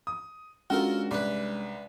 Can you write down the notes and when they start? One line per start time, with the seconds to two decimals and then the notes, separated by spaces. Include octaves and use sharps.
0.07 D#6
0.70 G#3 C#4 D4 F4 F#4 A4 A#4
1.11 C2 B4 D5